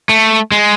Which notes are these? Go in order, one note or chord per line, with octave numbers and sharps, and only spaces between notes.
A3
G#3